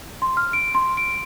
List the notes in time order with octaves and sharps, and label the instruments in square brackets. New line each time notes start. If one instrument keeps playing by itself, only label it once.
[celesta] C6
F6
D7
C6
D7